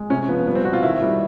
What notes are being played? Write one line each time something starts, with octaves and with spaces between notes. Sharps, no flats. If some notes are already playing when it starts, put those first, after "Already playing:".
Already playing: G#3
C3 C#4
F3 B3
G3 B3
C4
B2 F#4
F4
D#3 E4
G3